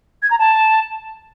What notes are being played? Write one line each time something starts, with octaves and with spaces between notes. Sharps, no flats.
G#6
A#5
A5